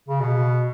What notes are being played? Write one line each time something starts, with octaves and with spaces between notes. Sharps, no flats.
C#3
B2